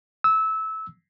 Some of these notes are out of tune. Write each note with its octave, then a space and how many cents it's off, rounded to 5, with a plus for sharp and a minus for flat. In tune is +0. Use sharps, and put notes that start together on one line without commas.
E6 -20